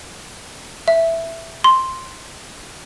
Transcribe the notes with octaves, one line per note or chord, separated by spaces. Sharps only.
E5
C6